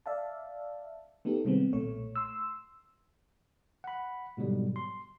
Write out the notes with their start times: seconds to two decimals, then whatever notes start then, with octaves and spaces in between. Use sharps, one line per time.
0.06 D5 E5 F5 A5
1.25 A3 B3 D#4 G4 A4
1.45 C3 D#3 G3 G#3 B3 C4
1.73 B1 A#2 A3 C#5
2.16 C6 E6
3.84 F#5 B5
4.37 G#2 B2 D3 F#3 G3
4.76 C6